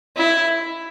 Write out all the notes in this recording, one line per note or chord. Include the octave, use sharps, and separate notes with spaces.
E4